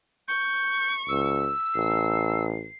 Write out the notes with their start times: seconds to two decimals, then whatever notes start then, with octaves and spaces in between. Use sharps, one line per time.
0.28 C#6 G6
1.09 C#2 E6
1.75 A1 C7